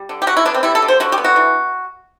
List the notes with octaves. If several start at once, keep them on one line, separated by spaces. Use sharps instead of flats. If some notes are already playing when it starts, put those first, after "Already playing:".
Already playing: G3
D3
G4
D3 F#4
E4
B3 D4
C4
G3 E4
A4
D3
C5
D3 F#4
G4
B3
F#4
E3